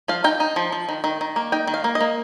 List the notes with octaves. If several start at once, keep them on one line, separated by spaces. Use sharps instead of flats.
F3 F5
D#4 G5
D#4
F3
F3
D#3
D#3
D#3
A#3
D#4 G5
D#3
F5
A#3
D#5
A#3